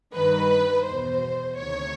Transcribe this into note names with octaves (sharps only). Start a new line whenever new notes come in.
G2 D#3 B4
E2 B2 C5
D2 C3 D#3 C#5